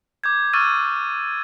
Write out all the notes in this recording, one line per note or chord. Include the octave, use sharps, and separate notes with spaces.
D6 G6 G#6
C#6 D6 E6 F6 A6 D#7